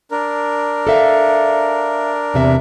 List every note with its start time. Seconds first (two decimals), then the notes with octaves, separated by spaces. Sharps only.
0.11 D4 A#4
0.87 A4 E5 F5
2.34 E2 C3 E5